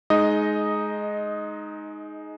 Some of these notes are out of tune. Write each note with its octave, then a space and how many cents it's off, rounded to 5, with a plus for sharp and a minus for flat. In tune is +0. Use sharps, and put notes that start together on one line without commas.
G#3 +20 D#4 +0 D#5 +0